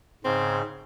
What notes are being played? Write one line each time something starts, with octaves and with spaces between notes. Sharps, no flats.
G#2 C#3 C4